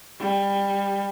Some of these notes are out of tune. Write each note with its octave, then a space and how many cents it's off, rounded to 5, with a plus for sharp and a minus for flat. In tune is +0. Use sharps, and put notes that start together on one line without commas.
G3 +20